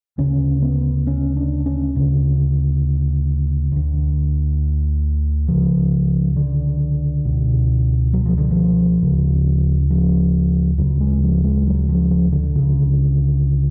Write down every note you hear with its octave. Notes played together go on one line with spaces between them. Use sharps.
D2 C#3 C#4
B3
C#4
D4
C#4
D2 C#3
D2 D3
C#2 C#3 F3
D3
C#2 B2
F#3
F3
D3
F3
D2 C#3
F3
D2 C#3 F#3
G#3
F3
G#3
F#3
F3
F3
D3
C#2 C#3